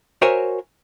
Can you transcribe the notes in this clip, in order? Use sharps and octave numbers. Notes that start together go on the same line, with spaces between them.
F#4 A#4 C5 C#5 E5 G#5